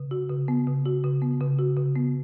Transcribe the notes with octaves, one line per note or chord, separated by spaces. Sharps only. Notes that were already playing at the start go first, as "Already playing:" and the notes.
Already playing: C#3
F#4
C#3
B3
C#3
F#4
C#3
B3
C#3
F#4
C#3
B3